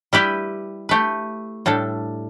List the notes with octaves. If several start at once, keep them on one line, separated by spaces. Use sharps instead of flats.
G3 E4 G4 B4
A3 G4 B4
A2 G3 D4 A4